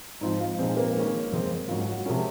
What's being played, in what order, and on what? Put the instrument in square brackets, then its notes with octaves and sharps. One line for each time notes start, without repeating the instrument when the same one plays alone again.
[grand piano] G#2 F3 C4 F4 [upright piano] D#4
[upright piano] F4
[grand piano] A#2 F3 G#3 D#4 [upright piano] C4
[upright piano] A#3
[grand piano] D#3 G#3 C#4
F#2 C#3 G#3 C4
[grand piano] G#2 F#3 C#4 F#4 [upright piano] F4
[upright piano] F#4
[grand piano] C3 F3 G#3 C#4 [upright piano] A#4